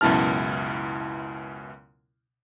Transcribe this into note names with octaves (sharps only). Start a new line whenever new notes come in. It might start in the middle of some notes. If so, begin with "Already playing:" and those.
C#2 F#2 B2 E4 A5 F6